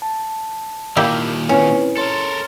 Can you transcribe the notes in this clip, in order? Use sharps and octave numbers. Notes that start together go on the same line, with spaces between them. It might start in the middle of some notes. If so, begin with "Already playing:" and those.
A5
A#2 D#3 A#3 E4 G4
C4 C#4 E4 B4
A4 A#4 C#5 C6 A6